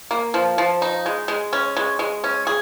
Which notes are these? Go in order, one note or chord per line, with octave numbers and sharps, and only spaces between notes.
A#3
F3
F3
D#4
G#3
G#3
C#4
G#3
G#3
C#4
G#4